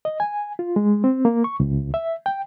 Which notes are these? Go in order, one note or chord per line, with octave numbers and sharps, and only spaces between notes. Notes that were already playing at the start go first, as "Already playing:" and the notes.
D#5
G#5
F4
G#3
C4
A#3
C#6
C#2
E5
G5